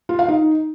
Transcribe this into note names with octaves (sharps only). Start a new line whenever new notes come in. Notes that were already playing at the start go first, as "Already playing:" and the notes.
F4
F5
D#4